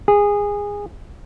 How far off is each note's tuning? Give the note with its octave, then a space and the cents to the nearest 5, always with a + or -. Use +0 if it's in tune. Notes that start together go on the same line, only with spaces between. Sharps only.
G#4 -20